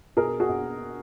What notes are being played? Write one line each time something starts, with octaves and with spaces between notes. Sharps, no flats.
B2 G#4 A#4
F#4 G#4
B2